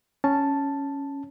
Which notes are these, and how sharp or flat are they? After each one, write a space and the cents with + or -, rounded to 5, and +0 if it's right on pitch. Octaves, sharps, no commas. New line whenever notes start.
C#4 +0 A5 +0